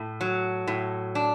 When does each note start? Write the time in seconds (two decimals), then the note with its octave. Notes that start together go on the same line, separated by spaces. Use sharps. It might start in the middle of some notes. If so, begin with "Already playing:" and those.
Already playing: A2
0.21 F#3
0.67 A2
1.15 D4